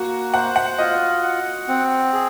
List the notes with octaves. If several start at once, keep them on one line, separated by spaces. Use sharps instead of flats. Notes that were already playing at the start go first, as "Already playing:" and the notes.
Already playing: A#3 F#4
C5 F#5
F#5
F4 D#5
F#5
C4
G#4